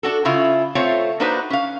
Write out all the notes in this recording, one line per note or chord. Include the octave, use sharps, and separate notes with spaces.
D4 F#4 A4
C#3 C#4 E4 F4
A3 C4 F4 C#5
A#3 D4 D#4 F#4 B4 C5
C#4 F5